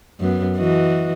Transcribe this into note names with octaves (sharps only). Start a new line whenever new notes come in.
F#2 B3
E3 F#4 D#5